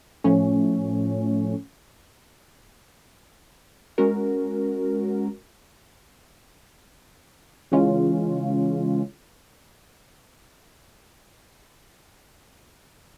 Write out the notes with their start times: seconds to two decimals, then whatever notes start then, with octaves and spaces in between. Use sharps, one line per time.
0.24 A2 F3 A3 C#4
3.98 G#3 C#4 F#4 A#4
7.72 C#3 E3 G#3 C#4 F4